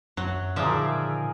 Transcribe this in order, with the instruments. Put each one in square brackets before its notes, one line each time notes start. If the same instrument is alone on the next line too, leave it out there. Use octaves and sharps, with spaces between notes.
[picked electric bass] F#2 [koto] F#3
[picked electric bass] A#2 D3 D#3 [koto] F3 E5 [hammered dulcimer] G#4 A#4 D5